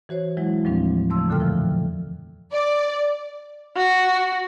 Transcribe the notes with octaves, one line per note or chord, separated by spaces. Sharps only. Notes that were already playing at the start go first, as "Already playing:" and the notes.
E3 F#4 C5 C#5
E3 F#3 G#3 E4
D#2 A2 F3 G3 C4 D4
C#3 F3 A3 C6 E6
F2 A#2 D3 A4 G5 F6
E3 F3
D5
F#4